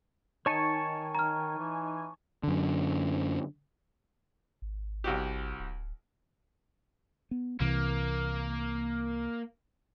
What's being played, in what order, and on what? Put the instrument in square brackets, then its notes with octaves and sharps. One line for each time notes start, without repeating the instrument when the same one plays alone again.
[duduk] D#3 [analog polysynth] D#4 G#5 [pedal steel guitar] C#5 A5 C#6
[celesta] A#5 F6
[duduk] E3
[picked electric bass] F#2 D3
[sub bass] G#1
[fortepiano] C2 F#4 G4
[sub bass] D1
[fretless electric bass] B3
[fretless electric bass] C2 C3 E3 [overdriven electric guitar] A#3